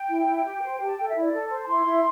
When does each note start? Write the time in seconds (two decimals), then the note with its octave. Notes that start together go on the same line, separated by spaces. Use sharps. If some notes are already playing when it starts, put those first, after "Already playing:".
Already playing: G5
0.08 E4
0.26 E4
0.44 G4
0.61 C5
0.79 G4
0.85 A5
0.97 A4 G5
1.08 E5
1.15 E4
1.20 D5
1.33 A4
1.50 C5
1.62 A5
1.67 E4 C6
1.85 E4